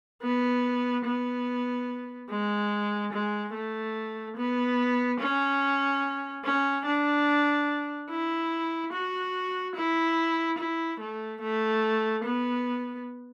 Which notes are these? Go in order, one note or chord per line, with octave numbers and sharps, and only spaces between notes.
B3
B3
G#3
G#3
A3
B3
C#4
C#4
D4
E4
F#4
E4
E4
A3
A3
B3